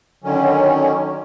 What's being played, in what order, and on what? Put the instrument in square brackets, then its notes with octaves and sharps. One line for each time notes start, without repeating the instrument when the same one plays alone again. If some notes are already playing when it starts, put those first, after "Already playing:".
[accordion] D3 D#3 F#3 C#4